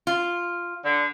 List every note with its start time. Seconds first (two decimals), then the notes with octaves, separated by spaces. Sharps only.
0.07 F4
0.84 D3